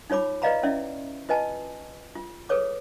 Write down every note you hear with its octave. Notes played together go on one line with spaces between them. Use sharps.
D#4 F4 C#5 B5 D6
B4 D5 D#5 F5 A#5 B5
C#4 E4 D5 E5
F4 B4 D#5 G#5 A5
F4
G#4 A4 B4 C#5 D6